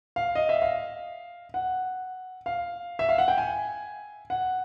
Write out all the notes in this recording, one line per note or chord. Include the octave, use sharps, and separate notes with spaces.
F5
D#5
E5
F5
F#5
F5
E5
F5
F#5
G5
G#5
F#5